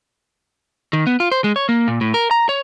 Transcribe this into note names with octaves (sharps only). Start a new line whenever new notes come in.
D#3
B3
F4
C5
G#3
C#5
A#3
A#2
A2
A#4
A#5
C#5